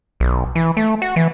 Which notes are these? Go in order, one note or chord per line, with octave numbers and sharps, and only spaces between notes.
B1
E3
A3
F#4
E3